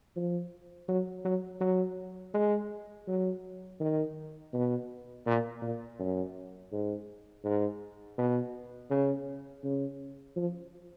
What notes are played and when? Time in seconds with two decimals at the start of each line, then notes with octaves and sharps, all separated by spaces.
0.16 F3
0.88 F#3
1.25 F#3
1.61 F#3
2.34 G#3
3.08 F#3
3.80 D#3
4.53 B2
5.26 A#2
5.62 A#2
5.99 F#2
6.72 G#2
7.44 G#2
8.18 B2
8.90 C#3
9.64 C#3
10.36 F3